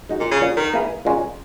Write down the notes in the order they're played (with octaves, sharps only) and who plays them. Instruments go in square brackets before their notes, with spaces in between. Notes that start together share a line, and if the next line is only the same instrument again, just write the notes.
[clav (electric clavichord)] G#3 D#4 F#4
[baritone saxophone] A#2
C#3
[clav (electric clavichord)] A#2 F#3 C#4
[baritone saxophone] D#3
[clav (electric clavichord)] A#3 E4 G#4 B4
A#2 G#3 C#4